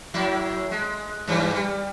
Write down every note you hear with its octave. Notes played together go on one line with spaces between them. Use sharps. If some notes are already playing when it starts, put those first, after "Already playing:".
A2 F#3 E4
G#3
G2 E3 G3
G3